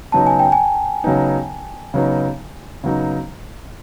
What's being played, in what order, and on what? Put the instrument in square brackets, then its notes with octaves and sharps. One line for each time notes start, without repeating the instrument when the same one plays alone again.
[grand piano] C#3 F#3 B3 D#4 [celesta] A5
[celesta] G#5
G5
G#5
[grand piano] C#3 F#3 B3 D#4
C#3 F#3 B3 D#4
C#3 F#3 B3 D#4